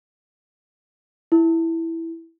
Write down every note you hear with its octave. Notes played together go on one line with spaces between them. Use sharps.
E4